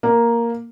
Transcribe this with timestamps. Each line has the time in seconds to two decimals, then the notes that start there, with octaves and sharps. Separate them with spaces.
0.03 A#3